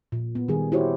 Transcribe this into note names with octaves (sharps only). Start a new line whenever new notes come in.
A#2
B3
D#3 G3 G#4
E4 F#4 G4 C5 C#5